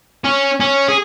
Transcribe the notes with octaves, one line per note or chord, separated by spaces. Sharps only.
C#4
C#4
G#4